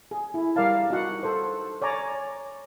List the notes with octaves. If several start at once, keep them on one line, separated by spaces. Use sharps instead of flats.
G#4
E4
G3 A#4 D5 F5 A5
D#4 F#4 F#5
A4 C5
C#5 D5 G#5 A#5